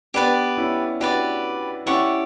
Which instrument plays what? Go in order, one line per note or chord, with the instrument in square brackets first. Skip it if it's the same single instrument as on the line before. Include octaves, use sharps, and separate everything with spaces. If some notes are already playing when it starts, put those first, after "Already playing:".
[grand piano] B3 D4 [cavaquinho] G4 B4 D5
[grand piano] C#4 E4
[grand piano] D4 F#4 [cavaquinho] G4 B4 D5
[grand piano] C#4 E4 [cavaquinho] G4 D5 F#5 C#6